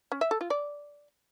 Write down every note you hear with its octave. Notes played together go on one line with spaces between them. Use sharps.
C#4
E5
A4
F4
D5